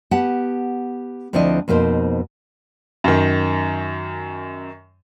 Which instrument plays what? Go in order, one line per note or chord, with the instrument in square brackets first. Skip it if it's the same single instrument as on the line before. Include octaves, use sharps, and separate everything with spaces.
[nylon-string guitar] B3 G4 F#5 A5
D2 F3 C4 D4 E4 D#5
F2 B2 A#3 D#4 C5
[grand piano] F#2 D#3